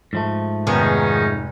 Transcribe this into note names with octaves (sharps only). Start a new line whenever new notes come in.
G#2 F3 A3
F1 D#3 B3 C#4 D#4 G#4